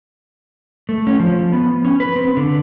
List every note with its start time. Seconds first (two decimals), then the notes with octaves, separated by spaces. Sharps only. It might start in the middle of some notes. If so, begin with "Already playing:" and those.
0.89 A3
1.07 C#4
1.20 F3
1.52 B3
1.85 C#4
2.00 B4
2.16 C4
2.37 D3